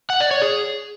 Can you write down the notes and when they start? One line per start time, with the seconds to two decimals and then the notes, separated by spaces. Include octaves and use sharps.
0.10 F#5
0.20 D5
0.31 C#5
0.42 G#4